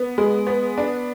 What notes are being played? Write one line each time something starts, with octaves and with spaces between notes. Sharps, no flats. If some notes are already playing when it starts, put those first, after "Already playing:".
Already playing: B3
G#3
B3
D4